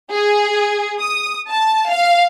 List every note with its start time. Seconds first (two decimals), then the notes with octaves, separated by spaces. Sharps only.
0.12 G#4
1.00 D#6
1.49 A5
1.90 F5